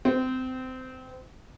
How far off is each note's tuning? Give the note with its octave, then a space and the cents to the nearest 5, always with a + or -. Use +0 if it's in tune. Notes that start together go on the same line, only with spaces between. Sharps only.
C4 -25